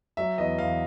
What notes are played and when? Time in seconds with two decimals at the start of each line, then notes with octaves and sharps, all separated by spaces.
0.17 F#3 E5
0.38 E2 D#5
0.58 E2 F5